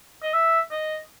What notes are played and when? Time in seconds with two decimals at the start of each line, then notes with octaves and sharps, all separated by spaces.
0.23 D#5
0.34 E5
0.71 D#5